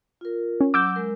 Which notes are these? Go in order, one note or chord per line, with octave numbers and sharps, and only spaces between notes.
F4 A#4
C#4
F#3 D6 E6 G6
G#3 A#4